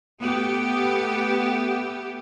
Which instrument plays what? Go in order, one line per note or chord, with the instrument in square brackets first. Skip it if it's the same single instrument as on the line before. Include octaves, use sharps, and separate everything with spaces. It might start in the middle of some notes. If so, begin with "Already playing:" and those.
[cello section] A3 B3 G4